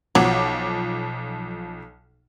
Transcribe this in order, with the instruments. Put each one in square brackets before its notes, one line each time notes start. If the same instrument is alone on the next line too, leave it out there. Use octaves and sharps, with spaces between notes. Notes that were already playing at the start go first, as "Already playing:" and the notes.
[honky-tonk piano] B1 F3 D6 [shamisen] F#3